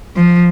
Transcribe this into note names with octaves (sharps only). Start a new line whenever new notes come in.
F3